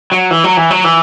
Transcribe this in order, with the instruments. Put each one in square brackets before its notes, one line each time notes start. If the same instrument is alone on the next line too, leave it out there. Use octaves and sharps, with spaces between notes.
[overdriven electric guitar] F#3
E3
F#3
E3
F#3
E3